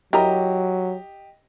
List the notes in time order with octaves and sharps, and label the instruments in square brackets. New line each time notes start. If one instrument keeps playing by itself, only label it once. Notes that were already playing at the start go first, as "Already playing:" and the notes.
[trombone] F#3 [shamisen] E4 A#4 A#5 [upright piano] G4 D#5